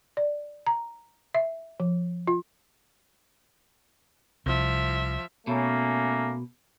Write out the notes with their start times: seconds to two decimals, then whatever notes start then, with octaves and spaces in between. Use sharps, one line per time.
0.17 D5
0.67 A#5
1.34 E5
1.80 F3
2.27 F4
4.46 C2 F3 E5
5.47 B2 A3 A#3 C#4